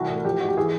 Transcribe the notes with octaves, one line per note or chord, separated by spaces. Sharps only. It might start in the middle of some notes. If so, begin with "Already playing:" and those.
Already playing: C2 E3 F#4
A2
F3 G4
G#2 F#4
G4
E3 G#4